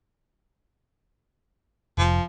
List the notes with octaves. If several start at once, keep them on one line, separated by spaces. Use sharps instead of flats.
F1 F3